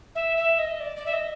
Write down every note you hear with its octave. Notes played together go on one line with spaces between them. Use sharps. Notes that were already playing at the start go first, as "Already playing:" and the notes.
E5
E5
D#5
D5
D5
E5
D#5